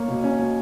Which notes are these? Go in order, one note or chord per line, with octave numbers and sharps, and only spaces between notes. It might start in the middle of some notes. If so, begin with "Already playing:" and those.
Already playing: A#3 C#5
B2
C#4
B2